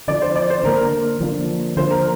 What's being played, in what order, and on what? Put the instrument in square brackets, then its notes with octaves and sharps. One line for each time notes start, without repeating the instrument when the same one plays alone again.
[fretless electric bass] D3 F3 A#3 D4 [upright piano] D5
[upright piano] C5
D5
C5
[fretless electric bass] D3 F3 A#3 D4 [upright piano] A#4
[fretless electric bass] D3 F3 A#3 D4
[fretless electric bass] D3 F3 A#3 D4 [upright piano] C5
[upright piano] A#4